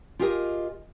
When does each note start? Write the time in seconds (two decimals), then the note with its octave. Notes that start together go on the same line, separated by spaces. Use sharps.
0.19 F4 G4 G#4 A#4 D#5